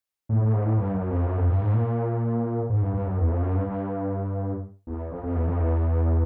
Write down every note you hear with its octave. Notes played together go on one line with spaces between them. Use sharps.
A2
A2
G#2
A2
G2
F#2
F2
F#2
F2
G2
G#2
A#2
G#2
G2
G2
F#2
E2
F2
F#2
G2
G2
E2
F2
F2
E2
F2
E2